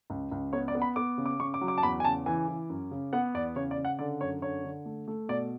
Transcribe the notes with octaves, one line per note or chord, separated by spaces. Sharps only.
C#2
C#2
B3 C#5
D5
B3
B5
B3 D6
C#3
D6
C#3 C#6
D6
F#3
D6
A5
E2 B5
G#5
C#3 A5
E3 G#5
E3
F#2
C#3
B3 F#5
E2 D5
C#3 C#5
D5
C#3
F#5
D3 D5
F#2 C#5
D3 C#5
D3
A3
A3
B2 D5